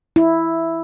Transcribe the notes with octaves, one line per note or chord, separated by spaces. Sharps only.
E4